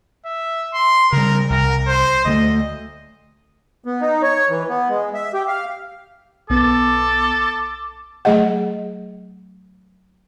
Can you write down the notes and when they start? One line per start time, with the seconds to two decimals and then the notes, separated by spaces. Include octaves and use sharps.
0.26 E5
0.74 C6
1.12 C#3 G3 A#4
1.50 C2 A#4
1.87 C5
2.25 D2 G3 A3 D#5
3.84 B3
4.01 D#4
4.23 C#5
4.50 E3
4.70 B3
4.90 G#3
5.14 E5
5.34 G4
5.48 F5
6.50 B1 B3 A4 D6
8.25 F#3 A3 G#4 D#5 F#5